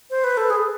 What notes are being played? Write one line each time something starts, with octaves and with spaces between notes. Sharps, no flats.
C5
B4
A4
G#4